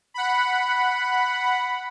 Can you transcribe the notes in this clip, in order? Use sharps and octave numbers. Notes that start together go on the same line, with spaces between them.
F#5 B5